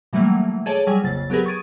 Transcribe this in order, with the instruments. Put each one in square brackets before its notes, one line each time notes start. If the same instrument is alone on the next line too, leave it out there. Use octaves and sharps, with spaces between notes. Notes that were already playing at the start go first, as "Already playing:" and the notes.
[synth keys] B2 E3 F#3 G3 A3 A#3
G#4 A4 C#5 D5 A5
F#3 G3 G#4 G#5
A#1 F2 C#3 A6
F#3 B3 G4 G#4 A#4 B4
C#6 D#6 G#6 A6 D7 D#7